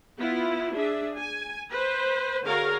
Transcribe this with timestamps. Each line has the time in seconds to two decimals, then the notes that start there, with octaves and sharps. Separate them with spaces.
0.20 B3 E4 F4
0.74 D4 G#4 E5
1.17 G#5
1.69 B4 C5
2.45 D3 F#4 G#4 A#4 C#5 F5